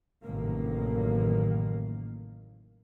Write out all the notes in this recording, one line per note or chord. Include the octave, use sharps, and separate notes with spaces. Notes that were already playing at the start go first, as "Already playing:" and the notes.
A1 F#2 A2 C3 D#3 A#3